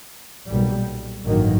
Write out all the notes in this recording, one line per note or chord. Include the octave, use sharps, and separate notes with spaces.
B1 A#2 G3
A1 G2 D#3 F#3 A#3